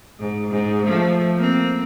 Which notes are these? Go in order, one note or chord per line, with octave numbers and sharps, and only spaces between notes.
G#2
G#2
F3 A3
A#3 C4